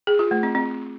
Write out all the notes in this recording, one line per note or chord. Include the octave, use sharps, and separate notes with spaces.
G#4
F4
A3
C4
C4